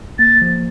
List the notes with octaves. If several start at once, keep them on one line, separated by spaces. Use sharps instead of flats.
A#3 A6
F3